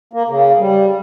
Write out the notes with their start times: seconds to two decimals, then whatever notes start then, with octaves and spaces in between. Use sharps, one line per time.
0.13 A#3
0.29 C#3
0.59 G3